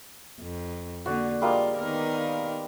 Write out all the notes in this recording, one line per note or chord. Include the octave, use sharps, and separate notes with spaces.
F2
D3 A#3 F#4 D5
G3 G#3 A#3 F4
D#3 B3 A#4